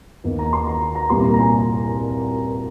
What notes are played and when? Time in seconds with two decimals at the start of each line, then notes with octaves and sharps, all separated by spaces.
0.24 D#2 D#3 A#3
0.39 A#5
0.53 C6
0.67 A#5
0.95 A#5
1.10 C2 A#2 G3 A#3 C6
1.24 A#5
1.34 A#5
1.39 G#5